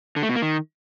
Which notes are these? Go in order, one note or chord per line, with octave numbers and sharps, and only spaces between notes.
D3
A3
B2
A#3
D#3